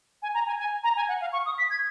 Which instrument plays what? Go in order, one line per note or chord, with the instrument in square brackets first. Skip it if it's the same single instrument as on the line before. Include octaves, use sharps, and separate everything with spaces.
[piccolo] G#5
A#5
G#5
G#5
A#5
G#5
F#5
F5
C#6
D#6
B6
G#6